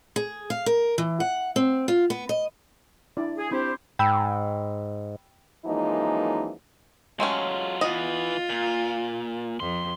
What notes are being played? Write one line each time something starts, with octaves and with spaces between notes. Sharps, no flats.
G#4
F5
A#4
E3
F#5
C4
F4
B3
D#5
D4 E4 D5
G#4
C4 D4 E4 G4 C5
G#2 G5 B5 E6
F#2 E3 F3 G#3 A#3 D#4
F#3 G#3 A3 C#4 F4
E3 B3 F4 D#5
A#2
F2 C6